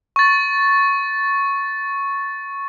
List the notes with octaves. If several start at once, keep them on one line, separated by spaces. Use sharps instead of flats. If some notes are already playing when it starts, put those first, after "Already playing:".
C#6 A6